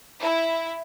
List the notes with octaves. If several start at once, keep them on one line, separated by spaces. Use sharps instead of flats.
E4